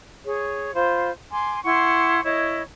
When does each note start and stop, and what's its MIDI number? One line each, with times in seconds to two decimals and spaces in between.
0.25 0.75 68
0.25 0.75 73
0.75 1.11 65
0.75 1.11 72
0.75 1.11 83
1.31 1.60 80
1.31 1.60 84
1.31 1.60 86
1.64 2.21 64
1.64 2.21 78
1.64 2.21 84
1.64 2.21 85
2.24 2.61 64
2.24 2.61 73
2.24 2.61 75